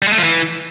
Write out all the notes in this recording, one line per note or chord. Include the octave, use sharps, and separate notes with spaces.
G3
G#3
A3
F3
E3